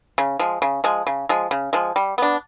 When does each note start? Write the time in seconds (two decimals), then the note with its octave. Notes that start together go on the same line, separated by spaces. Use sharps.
0.18 C#3
0.39 F3 G#3
0.62 C#3
0.84 F3 G#3
1.07 C#3
1.29 F3 G#3
1.51 C#3
1.73 F3 G#3
1.96 G3
2.18 B3 D4